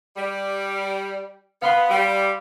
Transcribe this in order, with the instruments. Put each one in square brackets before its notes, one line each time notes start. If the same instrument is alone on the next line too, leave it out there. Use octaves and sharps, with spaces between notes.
[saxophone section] G3
[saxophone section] B3 [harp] F5 B5 C6
[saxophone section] G3